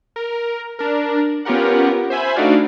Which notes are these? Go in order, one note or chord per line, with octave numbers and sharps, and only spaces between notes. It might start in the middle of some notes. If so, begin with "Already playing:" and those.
A#4
D4 A#4
B3 C#4 F4 G4 A#4 F#5
C5 E5 G#5 B5
A3 D4 D#4 F#4 D5 F5